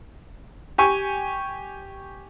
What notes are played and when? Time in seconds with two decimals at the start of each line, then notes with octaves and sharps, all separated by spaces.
0.78 G4 G#5 C#6